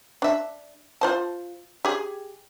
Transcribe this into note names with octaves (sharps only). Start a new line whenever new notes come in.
D4 E5
F4 C5 A5
G4 G#4